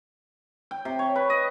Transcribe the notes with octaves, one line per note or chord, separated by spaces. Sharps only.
G5
C3
C#5
B4
D#5